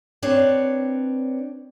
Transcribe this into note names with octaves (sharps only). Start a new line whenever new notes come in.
C4 D4 B4 C#5